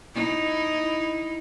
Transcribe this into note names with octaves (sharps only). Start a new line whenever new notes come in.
D#4 E4